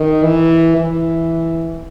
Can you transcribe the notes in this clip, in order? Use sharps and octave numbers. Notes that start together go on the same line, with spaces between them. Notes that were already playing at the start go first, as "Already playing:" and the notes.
Already playing: D#3
E3
E3